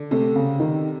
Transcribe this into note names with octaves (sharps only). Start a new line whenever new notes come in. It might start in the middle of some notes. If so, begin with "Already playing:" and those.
Already playing: D3
C3 A3
C#3
D#3